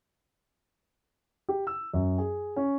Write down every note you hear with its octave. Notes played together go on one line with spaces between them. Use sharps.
G4
E6
F#2
G#4
C#4